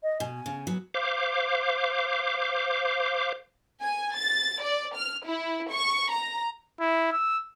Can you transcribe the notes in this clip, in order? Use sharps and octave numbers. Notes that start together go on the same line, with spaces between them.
D#5
B2 G#5
C#3
F#3 B3
C5 F5 D6
G#5
A6
D5
F6
E4
C#6
A#5
E4
E6